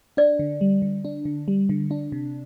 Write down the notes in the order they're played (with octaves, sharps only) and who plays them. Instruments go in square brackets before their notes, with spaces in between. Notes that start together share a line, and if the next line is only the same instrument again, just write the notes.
[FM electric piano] D4 [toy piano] D5
[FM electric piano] D3
G3
D3
D4
D3
G3
D3
D4
C3